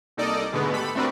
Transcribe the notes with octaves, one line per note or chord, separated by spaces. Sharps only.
C2 A#3 D#4 A4 D5 D#5
G#2 B2 D3 G#3 A3 B3
G4 A4 B5
A3 C4 D4 F#4 A#4 B4